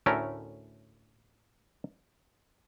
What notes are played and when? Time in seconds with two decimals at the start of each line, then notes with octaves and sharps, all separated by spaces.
0.06 D2 A2 A3 C#4 A#4 A#5